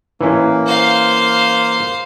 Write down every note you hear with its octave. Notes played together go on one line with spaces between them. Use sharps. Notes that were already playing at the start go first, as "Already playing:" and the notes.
E3 A#3 C#4
C5 F5